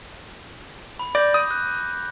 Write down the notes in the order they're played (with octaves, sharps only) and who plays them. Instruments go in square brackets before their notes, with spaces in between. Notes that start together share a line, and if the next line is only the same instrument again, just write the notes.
[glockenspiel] B5
[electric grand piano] D5 [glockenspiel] D6 G6 A#6
[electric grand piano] D#6
[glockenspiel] F#6